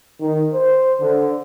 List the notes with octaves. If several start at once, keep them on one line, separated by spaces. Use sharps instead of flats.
D#3
C5
D3